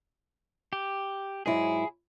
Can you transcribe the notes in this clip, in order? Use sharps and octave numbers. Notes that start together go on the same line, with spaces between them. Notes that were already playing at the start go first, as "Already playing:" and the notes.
G4
G#2 F#3 E4 G#4